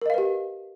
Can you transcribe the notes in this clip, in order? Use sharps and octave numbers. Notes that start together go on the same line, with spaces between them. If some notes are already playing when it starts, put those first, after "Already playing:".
G4 A#4 B4 D#5 F5